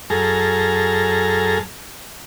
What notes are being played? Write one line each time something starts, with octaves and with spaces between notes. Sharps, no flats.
F#2 G#4 A4 A#5 F6